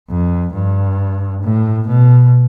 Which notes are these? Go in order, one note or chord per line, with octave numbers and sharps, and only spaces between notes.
F2
G2
A2
B2